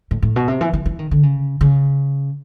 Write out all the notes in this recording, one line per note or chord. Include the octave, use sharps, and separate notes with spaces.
A2
A2
B2
C3
E3
E3
E3
D#3
D3
C#3
C#3